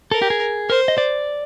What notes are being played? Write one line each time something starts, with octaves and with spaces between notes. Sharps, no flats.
A4 A#4
G4
G#4
A#4 C5
D#5
D5